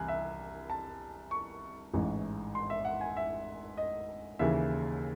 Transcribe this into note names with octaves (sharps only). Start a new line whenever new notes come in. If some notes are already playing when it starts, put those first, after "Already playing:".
Already playing: C2 E3 G#5 F#6
E5
A5
C#6
A1 G#2 E3
C6
E5
F#5
G#5
E5
D#5
D#2 C#3 E3 E5